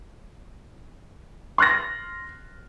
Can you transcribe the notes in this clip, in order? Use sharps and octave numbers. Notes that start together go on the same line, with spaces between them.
C6 F6 F#6 A6 A#6